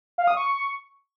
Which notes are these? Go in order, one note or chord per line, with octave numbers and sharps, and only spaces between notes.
F5
D#6
C#6